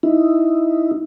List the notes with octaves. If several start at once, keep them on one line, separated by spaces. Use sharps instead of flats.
D#4 E4